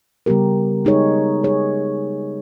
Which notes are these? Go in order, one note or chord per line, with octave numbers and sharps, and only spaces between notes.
C#3 G3 B3 G4 A#4
G#3 D#4 G#4 C#5
G#3 D#4 G#4 C#5